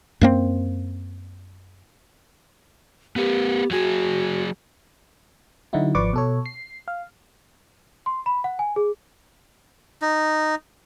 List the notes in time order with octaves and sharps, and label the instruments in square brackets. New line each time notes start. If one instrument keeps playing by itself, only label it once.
[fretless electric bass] F#2 A#3 C4
[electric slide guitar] B3 A#4 B4 [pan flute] G4
[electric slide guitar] F#3 G#4 [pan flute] F#4
[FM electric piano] D3 F#3 D#4 E4 F#4
G#1 F3 B4 D5 C#6 D6
B2 A4 C#5
C7
F5
[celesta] C6
B5
F#5
G#5
G#4
[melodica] D#4